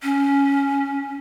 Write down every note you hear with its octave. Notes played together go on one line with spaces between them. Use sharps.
C#4